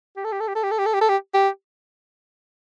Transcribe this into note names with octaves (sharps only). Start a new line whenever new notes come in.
G4
A4
G4
A4
G4
A4
G4
A4
G4
A4
G4
A4
G4
G4